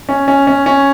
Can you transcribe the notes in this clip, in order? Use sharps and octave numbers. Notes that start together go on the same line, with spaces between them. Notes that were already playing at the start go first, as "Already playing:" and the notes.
C#4
C#4
C#4
C#4